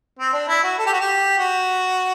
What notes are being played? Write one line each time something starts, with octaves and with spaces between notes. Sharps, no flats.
C4
D4
E4
F#4
A4
G4
F#4
G4
F#4